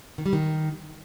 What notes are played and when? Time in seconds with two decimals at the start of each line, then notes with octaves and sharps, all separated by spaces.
0.18 D#3
0.26 G3
0.33 D#3